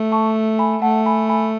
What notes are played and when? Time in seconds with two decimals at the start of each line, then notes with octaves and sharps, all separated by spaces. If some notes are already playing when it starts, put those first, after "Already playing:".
Already playing: A3
0.12 A5 C#6
0.59 G#5 B5
0.82 A3 F#5 A5
1.06 G#5 B5
1.29 G#5 B5